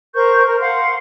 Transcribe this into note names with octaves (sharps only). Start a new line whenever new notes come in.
A#4 C5 C#6 G6
A#4
F5 F#5 C6